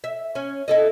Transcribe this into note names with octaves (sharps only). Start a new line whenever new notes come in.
E5
C#4
E4 A4 D#5